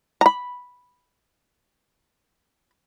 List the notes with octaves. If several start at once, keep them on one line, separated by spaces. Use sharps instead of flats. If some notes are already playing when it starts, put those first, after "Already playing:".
A#5 B5